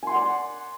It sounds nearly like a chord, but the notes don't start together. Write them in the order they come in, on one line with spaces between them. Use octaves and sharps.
G#5 C6 F#5 D5